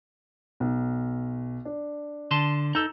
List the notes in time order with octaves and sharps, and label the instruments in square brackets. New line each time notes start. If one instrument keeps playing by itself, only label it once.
[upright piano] B1
D4
[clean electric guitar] D3 A5 C6
[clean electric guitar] D#4 A4 [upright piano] E6